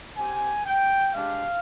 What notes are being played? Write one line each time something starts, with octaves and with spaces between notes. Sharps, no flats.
C4 G4 G#5
G5
G#3 D4 G4 F5